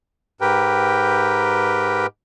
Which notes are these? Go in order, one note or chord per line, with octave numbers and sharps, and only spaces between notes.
G#2 G4 A#4 B4 G5